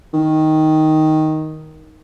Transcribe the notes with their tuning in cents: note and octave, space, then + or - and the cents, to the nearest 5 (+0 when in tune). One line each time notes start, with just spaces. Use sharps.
D#3 +5